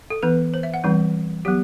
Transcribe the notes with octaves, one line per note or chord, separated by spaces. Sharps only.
A4
E3 B3 B4
C5
E5
F#5
E3 G3 C4
F#3 B3 G4